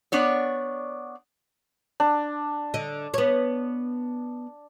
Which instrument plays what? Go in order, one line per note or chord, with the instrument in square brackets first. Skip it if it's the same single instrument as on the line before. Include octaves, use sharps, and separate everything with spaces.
[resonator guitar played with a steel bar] B3 D4 C#5 D5
[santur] D4
[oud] D3 D#5
B3 C#5